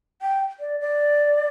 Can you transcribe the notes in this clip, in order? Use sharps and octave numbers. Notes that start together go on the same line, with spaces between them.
G5
D5
D5